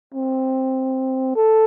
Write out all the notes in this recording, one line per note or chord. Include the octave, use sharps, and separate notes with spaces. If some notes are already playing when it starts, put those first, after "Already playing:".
C4
A4